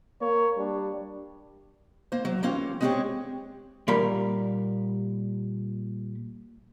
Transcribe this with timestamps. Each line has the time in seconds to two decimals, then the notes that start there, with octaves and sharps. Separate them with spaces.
0.21 A#3 C#5
0.58 G3 D4
2.12 A#3 C5
2.25 F#3
2.43 E3 A#3 C#4 F4 G4
2.81 G#3 C4 D4 F#4 G4 C#5
3.88 A#2 G3 A#4 B5